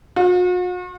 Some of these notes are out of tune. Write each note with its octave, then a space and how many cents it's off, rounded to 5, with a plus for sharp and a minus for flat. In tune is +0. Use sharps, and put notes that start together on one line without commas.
F#4 -45